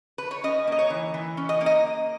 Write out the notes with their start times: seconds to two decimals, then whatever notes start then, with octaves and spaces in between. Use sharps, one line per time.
0.18 B4
0.31 C#5
0.44 C#4 D#5
0.67 A#3 D#5
0.79 C#5
0.90 E3
1.14 E3
1.37 C#4
1.49 D#5
1.61 A#3
1.66 D#5